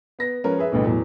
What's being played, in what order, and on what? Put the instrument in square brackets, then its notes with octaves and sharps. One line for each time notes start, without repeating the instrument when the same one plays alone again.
[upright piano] B3 A#6
F3 G#3 C#4 A#4 B4
G#4 B4 E5
A1 D2 G2 B2
E2 A2 F#3